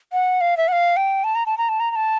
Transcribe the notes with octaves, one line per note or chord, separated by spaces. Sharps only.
F#5
F5
E5
F#5
F5
G5
A5
A#5
A5
A#5
A5
A#5
A#5
A5